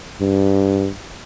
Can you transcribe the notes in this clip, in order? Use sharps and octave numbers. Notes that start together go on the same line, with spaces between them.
G2